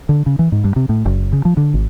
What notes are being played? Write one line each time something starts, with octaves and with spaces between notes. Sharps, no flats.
D3
C#3
E3
G#2
G2
C3
A2
F#1
C#3
F3
D3
G#1